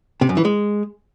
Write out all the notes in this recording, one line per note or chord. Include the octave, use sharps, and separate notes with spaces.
C3
F#2
E3
G#3